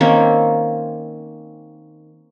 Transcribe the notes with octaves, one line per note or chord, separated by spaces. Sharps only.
D#3 A#3 C4 C#4